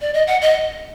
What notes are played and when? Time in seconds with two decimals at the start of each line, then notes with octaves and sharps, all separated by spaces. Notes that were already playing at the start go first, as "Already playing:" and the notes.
0.01 D5
0.14 D#5
0.27 F#5
0.42 D#5